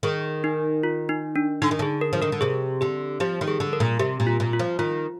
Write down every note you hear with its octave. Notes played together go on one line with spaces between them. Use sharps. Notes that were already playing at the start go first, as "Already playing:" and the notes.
D#3 G#4
D#4
F4
D#4
D4
D3 D#4
D#3
D3 G#4
A#4
F3
D#3 A#4
D3
C3 G#4
D3 G4
F3 G4
D#3
G#4
D3
A#4
A#2
C3 G4
A#2
F4
A#2
F4
F3
D#3 F4